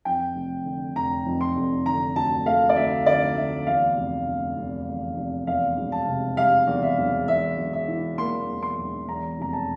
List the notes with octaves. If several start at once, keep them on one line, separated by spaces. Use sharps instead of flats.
F2 G5
F1
D3
F1 A#5
F2
C6
F1
D3 A#5
D2 A5
A3 F5
D5
D2 E5
D3 D5
D2 E5
E2 F5
F1
D3
F1
E2
F1
E2 F5
E1
A5
C3
G3 F5
E2
E5
E1
E2 E5
E1
E5
E3
A#3 C6
E2
C6
E1
E2 A#5
F1 A#5
A5